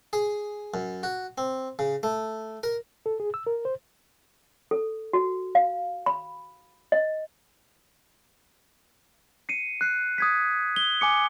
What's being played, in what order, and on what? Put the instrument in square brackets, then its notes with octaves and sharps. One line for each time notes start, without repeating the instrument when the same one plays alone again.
[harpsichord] G#4
F#2
F#4
C4
C#3
A3
A#4
[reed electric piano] A4
G#4
E6
A#4
C5
[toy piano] A4
F#4
F5
B5
D#5
[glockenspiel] C7 C#7 D#7
F#6 C7
D#6 G#6 B6
G7
G#5 D6 C#7